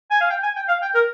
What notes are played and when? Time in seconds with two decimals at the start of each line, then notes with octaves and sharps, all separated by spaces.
0.11 G#5
0.20 F5
0.30 G5
0.43 G#5
0.56 G5
0.68 F5
0.82 G5
0.94 A#4